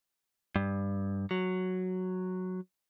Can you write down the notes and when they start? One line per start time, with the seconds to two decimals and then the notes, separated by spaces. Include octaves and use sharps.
0.56 G2
1.31 F#3